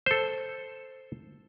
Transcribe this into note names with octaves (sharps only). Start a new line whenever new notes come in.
A4 C5